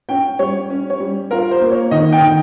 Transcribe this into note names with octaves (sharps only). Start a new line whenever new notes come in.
C#4 G5
G3 C#5
C#4
C#5
G3
F4 A#4
C5
A#3
C#5
D#3 D#5
G5
D#3